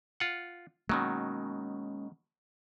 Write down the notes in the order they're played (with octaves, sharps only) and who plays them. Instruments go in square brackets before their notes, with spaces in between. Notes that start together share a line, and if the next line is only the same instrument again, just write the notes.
[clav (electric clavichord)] F4 F#5
[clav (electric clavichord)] B2 D#3 F#3 [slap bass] G#3 A#3 C#4